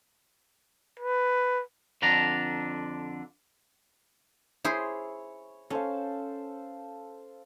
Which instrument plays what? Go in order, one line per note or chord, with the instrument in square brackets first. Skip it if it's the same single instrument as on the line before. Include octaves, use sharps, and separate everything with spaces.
[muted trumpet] B4
[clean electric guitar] F2 D3 D4 A#5
[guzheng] E4 G#4 C5 [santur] C#5
[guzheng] C#4 [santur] A4 C5 F5